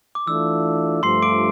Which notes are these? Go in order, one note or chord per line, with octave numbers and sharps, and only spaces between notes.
D6
E3 A3 D4 F4 E6
G2 F3 A3 C6 C7
D6 D7